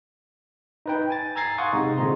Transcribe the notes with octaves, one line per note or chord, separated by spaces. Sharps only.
D#4 B4 G5
G#5 A6
G#5 A#5 E6 G#6 A6 C7
F5 F#5 C6 C#6 D#6
C3 G#3 D#4
A#2 D3 G#3 C4 A#5 C6